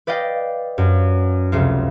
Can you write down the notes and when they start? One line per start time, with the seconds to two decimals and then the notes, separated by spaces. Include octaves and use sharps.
0.07 B4 D5 D#5 F5 G5
0.78 F#2
1.52 F1 C#2 F4